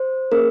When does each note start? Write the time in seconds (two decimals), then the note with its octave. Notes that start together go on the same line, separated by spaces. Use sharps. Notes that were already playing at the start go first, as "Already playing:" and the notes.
Already playing: C5
0.32 A#3 C#4 G#4 A#4